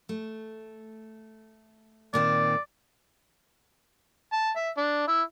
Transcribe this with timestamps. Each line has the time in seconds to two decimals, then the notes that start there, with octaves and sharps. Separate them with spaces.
0.09 A3
2.14 A#2 D#3 C4 D5
4.33 A5
4.56 E5
4.77 D4
5.08 E4